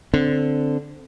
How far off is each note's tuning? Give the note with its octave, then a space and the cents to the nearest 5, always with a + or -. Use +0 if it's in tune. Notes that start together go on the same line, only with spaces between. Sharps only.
D3 +0 C4 -5